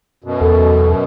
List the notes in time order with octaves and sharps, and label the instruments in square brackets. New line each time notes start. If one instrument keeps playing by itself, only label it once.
[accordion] F#2 B2
[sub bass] E2 [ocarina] A4